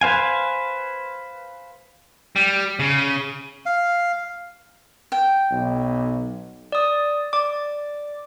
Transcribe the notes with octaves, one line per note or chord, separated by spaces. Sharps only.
B4 C5 F5 G#5
G3
C#3
F5
G5
B1
D5 D#6
D5 D6